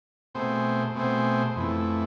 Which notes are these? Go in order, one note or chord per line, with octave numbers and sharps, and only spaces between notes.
B2 A3 C4 G#4 C5
B2 A3 C4 G#4 C5
F2 E3 A3